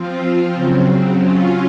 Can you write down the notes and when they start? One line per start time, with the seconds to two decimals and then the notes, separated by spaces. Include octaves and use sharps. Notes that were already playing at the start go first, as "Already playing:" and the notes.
Already playing: F3 C4 F4
0.54 C#3 F#3 C4
1.20 F#3 C#4 F4